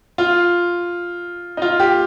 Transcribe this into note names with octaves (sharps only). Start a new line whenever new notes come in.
F4
D#4
F4
G4